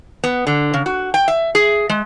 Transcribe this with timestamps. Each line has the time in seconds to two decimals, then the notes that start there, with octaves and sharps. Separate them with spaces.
0.24 B3
0.47 D3
0.74 C#3
0.86 F#4
1.14 G5
1.28 E5
1.55 G#4
1.89 G#3